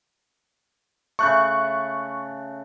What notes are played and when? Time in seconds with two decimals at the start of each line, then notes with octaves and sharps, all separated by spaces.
1.19 C#3 A3 C#6 F#6